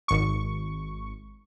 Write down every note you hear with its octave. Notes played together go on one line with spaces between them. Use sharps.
G#1 C#6